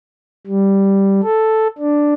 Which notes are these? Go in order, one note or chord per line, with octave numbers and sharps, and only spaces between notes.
G3
A4
D4